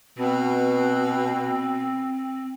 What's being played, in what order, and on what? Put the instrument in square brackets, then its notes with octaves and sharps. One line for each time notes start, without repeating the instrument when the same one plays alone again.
[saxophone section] B2 [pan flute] C4